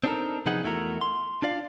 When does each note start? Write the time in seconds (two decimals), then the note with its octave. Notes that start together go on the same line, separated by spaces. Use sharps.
0.04 C4 D4 D#4 G4 A4 A#4
0.46 C3 F3 B3 D#4 G#4 F#5
0.63 E2 A3 E4 F#4 A#4
1.01 C6
1.42 D4 F4 D5 F5